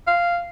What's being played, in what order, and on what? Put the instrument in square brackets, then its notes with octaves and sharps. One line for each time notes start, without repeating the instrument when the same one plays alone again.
[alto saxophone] F5